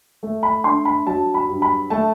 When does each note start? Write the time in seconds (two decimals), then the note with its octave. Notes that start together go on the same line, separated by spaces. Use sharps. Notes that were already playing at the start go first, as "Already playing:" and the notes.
0.23 A3
0.43 B5
0.64 D4 C6
0.85 B5
1.06 F#3 A5
1.34 B5
1.49 G2
1.62 B5
1.90 A3 A5